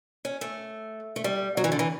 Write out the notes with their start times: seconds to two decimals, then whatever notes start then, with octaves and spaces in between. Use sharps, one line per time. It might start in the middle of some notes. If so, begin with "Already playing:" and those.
0.25 C#4
0.41 A3
1.16 A3
1.24 G3
1.57 F#3
1.64 E3
1.72 D3
1.79 E3